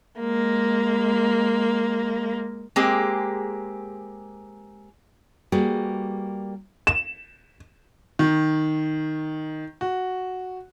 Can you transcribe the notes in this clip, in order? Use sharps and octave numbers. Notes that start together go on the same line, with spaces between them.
G#3 A#3
G#3 A#3 C4 G4 G#4
G3 A#3 F#4 G#4 B4
E7
D#3
F#4